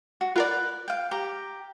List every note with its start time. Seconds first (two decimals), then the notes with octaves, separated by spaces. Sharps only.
0.21 F#4
0.36 F4 A#4 B4 D5
0.88 F5 G5
1.11 G4 A#5